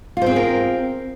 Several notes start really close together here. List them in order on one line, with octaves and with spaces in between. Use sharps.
F4 C5 C4 G#4 A#4